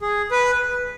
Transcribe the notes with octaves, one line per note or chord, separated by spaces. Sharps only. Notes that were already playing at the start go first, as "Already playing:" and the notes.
G#4
B4